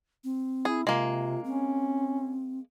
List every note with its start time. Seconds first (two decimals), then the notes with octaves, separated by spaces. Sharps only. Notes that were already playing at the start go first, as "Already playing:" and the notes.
0.24 C4
0.65 E4 G#4
0.87 C3 G#3 A#3 F4
1.44 C4 C#4